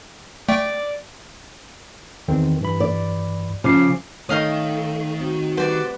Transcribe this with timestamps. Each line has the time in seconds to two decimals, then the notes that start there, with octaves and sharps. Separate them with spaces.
0.49 A3 D5 G5
2.28 E2 D#3 C4
2.61 G2 E3 B5
2.80 D5
3.64 C#3 F3 D6 C7
4.29 D#3 A3 D#4 A4 C#5 F5 D#6
5.21 C4 F#4
5.57 G3 B4 C5 D5 F#5